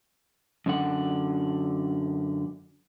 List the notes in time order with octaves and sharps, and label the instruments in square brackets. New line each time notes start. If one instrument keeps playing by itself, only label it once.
[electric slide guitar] F#2 D3 F#5